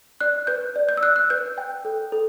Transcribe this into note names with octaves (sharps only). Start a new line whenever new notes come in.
D5 F#6
B4 G6
D5
G6
E6
D5 F#6
F#6
B4 G6
G5
A4
A4